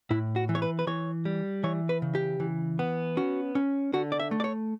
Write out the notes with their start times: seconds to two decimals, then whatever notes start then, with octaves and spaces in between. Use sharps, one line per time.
0.10 A2 E4
0.36 F#4
0.49 E3
0.55 C#5
0.62 B4
0.79 B4
0.87 E3 C#5
1.25 G3
1.64 E3 C#5
1.89 B4
2.02 C#3
2.15 G4
2.40 E3
2.79 B3
3.17 C#4 F#4
3.55 C#4
3.93 D3 F#4
4.12 D5
4.20 E5
4.31 A3
4.40 D5
4.44 C#5